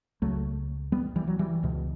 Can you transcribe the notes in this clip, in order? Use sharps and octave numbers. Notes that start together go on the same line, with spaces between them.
C#2 C#3 F#3 A3
G3 B3
E3 G3
F#3
E3 G3
C#2 B2